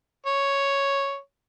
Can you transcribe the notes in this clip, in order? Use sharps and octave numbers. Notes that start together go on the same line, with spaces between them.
C#5